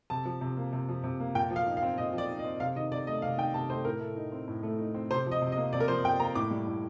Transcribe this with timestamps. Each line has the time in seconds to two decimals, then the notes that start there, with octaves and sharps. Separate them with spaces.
0.10 C3 A5
0.25 F3
0.41 C3
0.57 A#3
0.73 C3
0.89 F3
1.04 C3
1.20 A#3
1.35 A#2 G5
1.51 F3
1.56 F5
1.67 D#4
1.77 F5
1.82 C4
1.98 A#2 D#5
2.13 F3
2.18 D5
2.29 D#4
2.39 D#5
2.44 C4
2.60 C3 F5
2.76 D#3 D#5
2.91 C3 D5
3.07 A3 D#5
3.22 C3 F5
3.38 D#3 G5
3.54 C3 A5
3.69 A3 C5
3.85 A2 A#4
4.00 A3
4.16 D#4
4.32 C4
4.48 A2
4.63 A3
4.79 D#4
4.94 C4
5.11 C3 C5
5.27 F3 D#5
5.42 C3
5.52 D#5
5.57 A#3
5.73 C3 D5
5.80 A#4
5.88 F3 C5
6.04 C3 G5
6.20 A#3 A#5
6.35 A2 D6
6.51 G3
6.67 A2